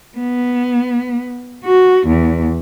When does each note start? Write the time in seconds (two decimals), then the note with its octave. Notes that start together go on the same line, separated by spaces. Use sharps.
0.18 B3
1.64 F#4
2.07 E2